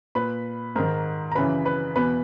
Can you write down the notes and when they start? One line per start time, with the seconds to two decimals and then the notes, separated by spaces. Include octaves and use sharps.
0.15 A#2 B4 B5
0.76 G#2 D#3 A#4 A#5
1.32 A#5
1.35 F#2 C#3 E3 B4 B5
1.65 B4 B5
1.96 E2 B2 B4 B5